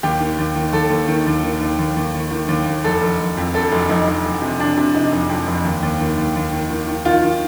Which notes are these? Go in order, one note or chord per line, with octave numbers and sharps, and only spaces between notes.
D#2 G4
D#3
D#2
D#3
D#2 A4
D#2
D#3
D#2
D#3
D#2
D#2
D#2
D#3
D#3
D#2
D#2
F1 A4
F1
F1
F2
F1 A4
F1
F1 D#4
F1
F1
C3
C3 D4
C3
C3 D#4
F1
F2
F1
D#2
D#2
D#3
D#2
D#2
D#3
D#3
D#3
D#3 F4
D#3